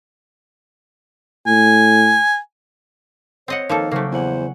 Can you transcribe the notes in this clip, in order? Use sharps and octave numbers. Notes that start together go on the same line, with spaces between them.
A2 G#5
C4 C#5 D#5 F#5
D#3 F3 A#3 A4
C#3 F#3 A3 A#3 G4 C5
E2 C5 F#5 G#5